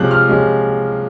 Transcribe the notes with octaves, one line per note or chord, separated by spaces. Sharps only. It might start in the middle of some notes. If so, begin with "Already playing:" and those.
Already playing: C3 F3 G#3 C#4 F#6
F6
C3 F3 G#3 C#4